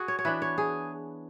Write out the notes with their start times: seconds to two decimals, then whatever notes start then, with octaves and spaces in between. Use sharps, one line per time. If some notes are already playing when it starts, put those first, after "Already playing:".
Already playing: F#4 G#4
0.08 C#5
0.19 C#5
0.25 E3 B3 D4 B4
0.42 C#5
0.58 G#4